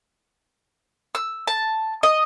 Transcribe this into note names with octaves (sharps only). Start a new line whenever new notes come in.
E6
A5
D#5